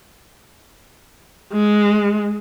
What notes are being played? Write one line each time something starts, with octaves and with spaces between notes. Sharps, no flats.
G#3